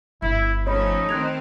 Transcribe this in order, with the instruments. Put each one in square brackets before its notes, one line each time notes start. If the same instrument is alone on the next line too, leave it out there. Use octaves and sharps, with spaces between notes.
[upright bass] G1 [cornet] E4
[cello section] F3 A3 C#4 [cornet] D#4 [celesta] C#5 B5
[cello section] D#3 C4 [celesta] F#6 G#6 F7